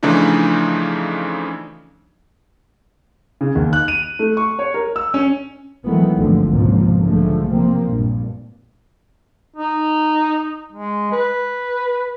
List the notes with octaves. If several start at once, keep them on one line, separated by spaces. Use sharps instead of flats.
C#3 E3 F3 A3 D4 D#4
C#3
D#2
F#6
D#7
A3
C#6
C#5
A#4
E6
C#4
D#3 E3 F#3 G#3 A3 B3
G#1 D2 G#2 D3 F3
G#1 C#2 G#2 B2 F3 A#3
B1 D3 F3 G#3 A3
C3 F3 A#3 C4
A#1 G2
D#4
G#3
B4